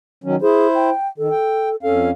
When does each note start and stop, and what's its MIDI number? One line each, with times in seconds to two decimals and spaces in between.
0.24 0.36 51
0.24 0.36 54
0.24 0.36 61
0.42 0.90 64
0.42 0.68 68
0.42 0.90 72
0.75 1.08 79
1.18 1.29 51
1.18 1.76 69
1.31 1.69 79
1.83 2.11 41
1.83 2.11 61
1.83 2.07 69
1.83 2.11 77